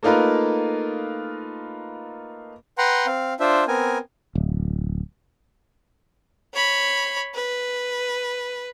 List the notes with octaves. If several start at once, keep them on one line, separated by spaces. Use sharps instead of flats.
A3 A#3 D#4 F4 A#4 B4
B4 F#5 G5 A#5 C6
C4 F5
D4 F4 C5 E5
B3 C4 A#4 G#5
D1
C#5 B5
B4